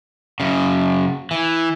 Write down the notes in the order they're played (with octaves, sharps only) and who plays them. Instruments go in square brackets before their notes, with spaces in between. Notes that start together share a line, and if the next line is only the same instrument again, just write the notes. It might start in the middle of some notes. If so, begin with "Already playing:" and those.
[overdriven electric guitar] F#2 C#3
E3